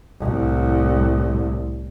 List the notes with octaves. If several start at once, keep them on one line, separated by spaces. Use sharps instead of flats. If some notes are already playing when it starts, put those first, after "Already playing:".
C2 A2